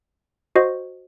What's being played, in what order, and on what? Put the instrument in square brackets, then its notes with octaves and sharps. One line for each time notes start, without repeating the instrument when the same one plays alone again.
[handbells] F#4 C5 D#5